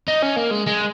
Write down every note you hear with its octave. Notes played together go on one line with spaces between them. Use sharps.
D#4
C#4
A#3
G#3
G#3